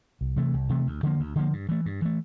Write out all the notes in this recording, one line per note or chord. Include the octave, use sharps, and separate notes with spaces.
C2
C3 E3 A3
C2
C3 E3 A3
D2
D3 F3 A#3
D2
D3 F3 A#3
G2
E3 A3
G2
E3 A3